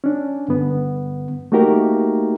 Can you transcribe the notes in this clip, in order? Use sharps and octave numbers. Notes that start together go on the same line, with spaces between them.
C#4 D4
G2 D3 B3
A3 A#3 D#4 F#4 G4 A#4